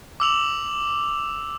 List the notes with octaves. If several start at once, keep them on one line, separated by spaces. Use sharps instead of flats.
D6 E6 F7 F#7